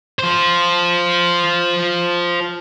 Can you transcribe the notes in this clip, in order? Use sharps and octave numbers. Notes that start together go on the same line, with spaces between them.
F4 C5